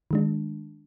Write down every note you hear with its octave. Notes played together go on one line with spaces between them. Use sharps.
D#3 G#3 D4